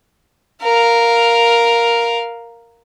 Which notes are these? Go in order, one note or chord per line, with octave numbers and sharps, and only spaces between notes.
A#4 F5